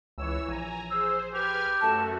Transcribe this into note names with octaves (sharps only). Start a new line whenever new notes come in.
C#2 E3 C#5 E6
A#1 G#5 A#5
G#4 C5 E6
G4 B4 F6 G#6
F#2 A3 F#4 A5